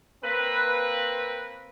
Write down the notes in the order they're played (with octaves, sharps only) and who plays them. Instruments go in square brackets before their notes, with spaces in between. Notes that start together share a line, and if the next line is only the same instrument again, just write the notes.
[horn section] A#3 C4 B4